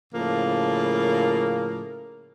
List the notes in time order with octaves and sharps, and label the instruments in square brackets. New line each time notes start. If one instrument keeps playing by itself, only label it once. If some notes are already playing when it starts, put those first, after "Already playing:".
[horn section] A2 C#3 F3 A#3